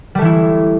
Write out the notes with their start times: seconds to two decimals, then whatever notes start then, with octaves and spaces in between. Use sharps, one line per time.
0.15 G3
0.18 A3
0.22 E3
0.25 E4